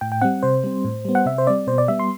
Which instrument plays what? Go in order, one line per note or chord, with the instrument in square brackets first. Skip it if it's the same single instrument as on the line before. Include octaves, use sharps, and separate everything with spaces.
[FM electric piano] A2 G5
G5
G3 C4 F#5
C3 C5
G3 C4
A2
G3 B3
F#5
C3 E5
C5
G3 C4 D5
B2 C5
D5
G3 B3 E5
C6